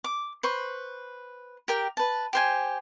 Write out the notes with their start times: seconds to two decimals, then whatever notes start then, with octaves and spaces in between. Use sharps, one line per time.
0.04 D6
0.43 B4 C5 C#6
1.68 G4 A#4 G5
1.97 B4 A5
2.33 G4 C5 G#5